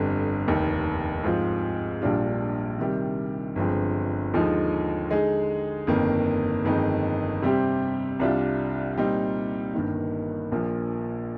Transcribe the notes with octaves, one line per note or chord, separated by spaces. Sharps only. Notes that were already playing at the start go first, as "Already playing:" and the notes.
Already playing: G1 F2 D3 G3
F1 D#2 D#3
G#2 F3 C4 F4
A#1 A#2 G3 D4 F4
C3 D#3 G3
G1 G2 F3 G#3 C4
D#2 D3 F3 G#3 D#4
D3 G#3 D#4 G#4
G1 F2 D#3 A#3
G1 F2 D#3 G#3 D#4
C3 G3 C4 G4
C2 C3 G3 D4 F4
A#2 G3 C4 D#4
G1 G2 D#3 A#3 D#4
A#1 A#2 F3 A#3